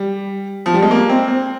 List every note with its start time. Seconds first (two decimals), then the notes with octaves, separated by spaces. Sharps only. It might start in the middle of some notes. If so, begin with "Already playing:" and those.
Already playing: G3
0.66 F3
0.74 G3
0.82 G#3
0.91 A#3
1.09 C4
1.28 C4